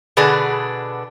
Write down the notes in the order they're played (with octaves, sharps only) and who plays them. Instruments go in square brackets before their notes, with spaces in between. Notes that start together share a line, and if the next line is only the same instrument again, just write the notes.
[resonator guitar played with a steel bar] B2 D3 B3 D4 G#4